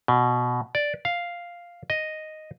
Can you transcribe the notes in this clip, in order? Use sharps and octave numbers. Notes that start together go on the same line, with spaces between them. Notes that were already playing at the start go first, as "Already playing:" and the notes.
B2
D5
F5
D#5